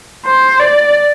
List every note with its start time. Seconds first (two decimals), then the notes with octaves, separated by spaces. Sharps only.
0.26 C5
0.60 D5